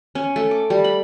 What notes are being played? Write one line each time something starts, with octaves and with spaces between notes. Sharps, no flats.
C#4
A3
D6
G3
B5